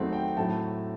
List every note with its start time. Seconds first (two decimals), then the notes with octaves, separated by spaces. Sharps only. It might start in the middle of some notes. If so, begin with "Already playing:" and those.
Already playing: E2 D#3 F#3 A3 C4 F#5
0.13 G5
0.37 A2 F#3 A3 C4 A5